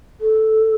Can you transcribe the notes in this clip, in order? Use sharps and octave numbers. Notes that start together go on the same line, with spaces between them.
A4